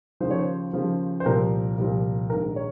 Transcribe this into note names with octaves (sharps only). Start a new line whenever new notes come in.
D#2 C#3 F3 C5
C#5
C5
D#2 C#3 F3
C5
C2 A#2 F3 A#4
C2 A#2 F3
A#1 G#2 D#3 A#4
C#5